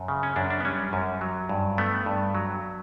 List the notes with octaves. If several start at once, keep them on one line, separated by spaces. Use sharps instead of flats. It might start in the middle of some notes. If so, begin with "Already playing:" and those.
Already playing: F#2
C#3
C#4
F#2 D4
D4
B3
G3 C#4
F#2
F#3
G2
A3 B3
G2
F#3